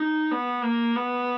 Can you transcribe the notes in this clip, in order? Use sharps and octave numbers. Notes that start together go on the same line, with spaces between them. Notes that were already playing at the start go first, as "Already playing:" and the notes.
Already playing: D#4
B3
A#3
B3